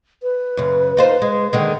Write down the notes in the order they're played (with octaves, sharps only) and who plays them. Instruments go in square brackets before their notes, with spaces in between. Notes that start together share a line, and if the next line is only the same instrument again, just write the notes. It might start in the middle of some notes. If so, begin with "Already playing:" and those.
[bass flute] B4
[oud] F#2 C#3
D#4 F4 C5
G#3
D3 D#3 G#3